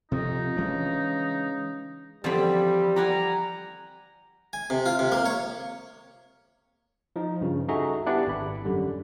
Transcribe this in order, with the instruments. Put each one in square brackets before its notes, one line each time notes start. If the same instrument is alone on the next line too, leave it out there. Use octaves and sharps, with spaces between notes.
[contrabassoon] F2 [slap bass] C3 [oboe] D#4
[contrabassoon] C#3 [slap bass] E3 G#3 D4
[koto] D3 E3 F3 [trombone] G3 [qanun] C4 B5
[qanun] G4 F#5 G#5 [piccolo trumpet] A#5
[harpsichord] G#5
C3
F4
C3
A#3
C#5
[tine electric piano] F3 D#4
G2 C#3
D#4 F#4 G#4 A4 E5 A#5
B3 D4 E4 G4 D5 F#5
G#1 B5
F#2 D3 G3